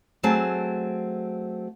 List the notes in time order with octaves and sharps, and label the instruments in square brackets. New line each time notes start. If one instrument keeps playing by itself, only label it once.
[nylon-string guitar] F#3 A3 C4 G#4 A5